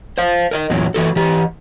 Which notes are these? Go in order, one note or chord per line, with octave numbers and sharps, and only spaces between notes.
C5 F5
A#4 D5 D#5
E2 A#2 F#3
E3 F#4 A4
E3 G4